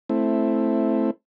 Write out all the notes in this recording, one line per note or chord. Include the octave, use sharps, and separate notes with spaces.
A3 C4 E4